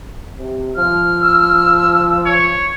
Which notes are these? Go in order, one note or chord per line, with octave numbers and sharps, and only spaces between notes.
C3
F3 F6
E6
C#5